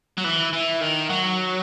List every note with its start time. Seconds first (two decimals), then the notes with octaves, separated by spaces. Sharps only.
0.18 F#3
0.24 E3
0.53 E3
0.81 D#3
1.09 F#3